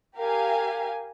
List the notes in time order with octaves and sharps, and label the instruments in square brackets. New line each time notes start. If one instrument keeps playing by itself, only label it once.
[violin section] G4 A#4 F5 G#5